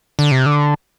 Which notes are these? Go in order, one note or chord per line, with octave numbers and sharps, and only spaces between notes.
D3
C3
D3